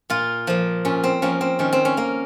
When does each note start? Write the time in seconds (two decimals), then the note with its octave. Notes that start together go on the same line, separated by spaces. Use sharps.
0.10 A#2 F4
0.47 F3 A#3
0.85 A#2 C#4
1.04 C4
1.22 F3 A#3 C#4
1.41 C4
1.59 D#3 C#4
1.73 C4
1.85 C#4
1.97 A#3